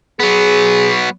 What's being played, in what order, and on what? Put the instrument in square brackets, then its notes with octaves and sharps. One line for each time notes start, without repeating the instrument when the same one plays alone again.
[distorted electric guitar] F#3 B3 [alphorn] G#4